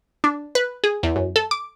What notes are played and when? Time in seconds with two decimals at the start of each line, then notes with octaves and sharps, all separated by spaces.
0.24 D4
0.55 B4
0.84 G#4
1.03 E2
1.16 F#2
1.36 A4
1.51 D6